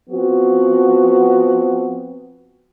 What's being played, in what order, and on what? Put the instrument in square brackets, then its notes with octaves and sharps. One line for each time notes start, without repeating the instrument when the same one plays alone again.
[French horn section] F3 B3 C4 F#4